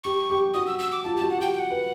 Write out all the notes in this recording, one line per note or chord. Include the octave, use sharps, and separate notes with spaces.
G4 C#6
G4
F#4 D#6
E6
E6
D6
F4 A5
G4
A5
F#4
F#5
G4 G5
G5
F#5
B4